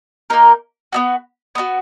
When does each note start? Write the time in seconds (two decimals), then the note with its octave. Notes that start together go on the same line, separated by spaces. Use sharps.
0.30 A#3 D#4 A#4
0.92 B3 D#4 F#4
1.55 B3 D#4 F#4